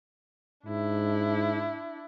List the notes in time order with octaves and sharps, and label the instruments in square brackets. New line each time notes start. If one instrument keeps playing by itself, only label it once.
[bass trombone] G#2 [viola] D4 E4